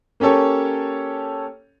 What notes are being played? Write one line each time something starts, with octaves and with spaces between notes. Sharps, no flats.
A#3 C#4 G4 A4 C#5